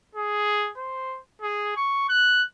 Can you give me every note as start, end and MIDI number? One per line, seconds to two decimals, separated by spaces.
0.15 0.71 68
0.77 1.19 72
1.41 1.73 68
1.76 2.05 85
2.09 2.44 90